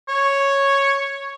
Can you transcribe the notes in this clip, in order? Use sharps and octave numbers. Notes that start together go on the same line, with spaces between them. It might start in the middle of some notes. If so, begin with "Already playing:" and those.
C#5